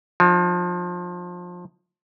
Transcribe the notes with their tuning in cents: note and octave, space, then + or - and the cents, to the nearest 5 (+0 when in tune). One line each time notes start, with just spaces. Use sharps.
F3 +25 D#4 -30